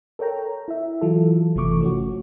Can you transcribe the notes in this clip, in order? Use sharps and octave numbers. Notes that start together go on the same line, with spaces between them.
A4 A#4 C#5 G5 A#5
E4 E5
E3 F#3 F4 A4
G1 C3 E3 A3 C#6 D6
F3 A3 C#4 F#4